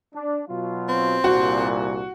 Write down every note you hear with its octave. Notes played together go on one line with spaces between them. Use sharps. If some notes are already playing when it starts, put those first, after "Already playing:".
D4
B2 F#3 F4
C4
C2 G2 A#2 F#4